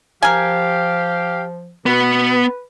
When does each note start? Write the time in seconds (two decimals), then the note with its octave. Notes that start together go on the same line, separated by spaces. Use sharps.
0.22 F3 G4 A#4 F5 G#5
1.86 B2 B3 B4